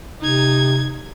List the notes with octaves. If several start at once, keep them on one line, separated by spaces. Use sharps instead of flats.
C3 D#4 G#6